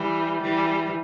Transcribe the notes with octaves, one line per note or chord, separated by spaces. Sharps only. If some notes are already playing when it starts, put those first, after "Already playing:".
Already playing: E3 G3
E3 G3